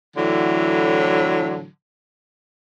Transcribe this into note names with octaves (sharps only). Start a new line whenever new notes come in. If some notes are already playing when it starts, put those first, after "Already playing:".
A2 D3 E3 F#3